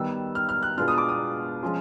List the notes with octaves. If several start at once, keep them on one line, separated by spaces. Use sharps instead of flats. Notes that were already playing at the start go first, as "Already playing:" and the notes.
Already playing: D#3 G3 B3 E6
F6
F6
F#6
B2 G#3 B3 D4 F4 F6
D#6
D6
D#6
F3 G#3 C#4 F4